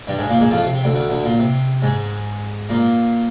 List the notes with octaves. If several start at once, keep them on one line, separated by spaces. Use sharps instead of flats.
G2 G3
G#2 G#3
A#2 A#3
G#2 G#3
F2 F3
C3
C3
D2 D3
D2 D3
D2 D3
A#2
C3
G#2 G#3
A#2 A#3